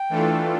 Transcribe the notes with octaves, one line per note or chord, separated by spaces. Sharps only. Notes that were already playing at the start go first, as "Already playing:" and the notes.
Already playing: G5
E3 A3 D4 F4 A4